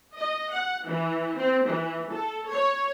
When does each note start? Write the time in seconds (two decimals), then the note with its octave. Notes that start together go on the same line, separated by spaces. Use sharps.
0.16 D#5
0.50 F#5
0.86 E3
1.36 C4
1.66 E3
2.10 A4
2.50 C#5